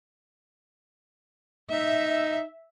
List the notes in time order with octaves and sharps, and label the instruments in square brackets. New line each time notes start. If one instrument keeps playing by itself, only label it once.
[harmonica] D#4 [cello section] E5